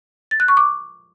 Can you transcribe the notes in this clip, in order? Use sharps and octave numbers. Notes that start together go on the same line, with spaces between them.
A6
F#6
C#6
D6